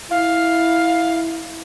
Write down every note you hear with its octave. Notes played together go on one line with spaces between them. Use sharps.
E4 F5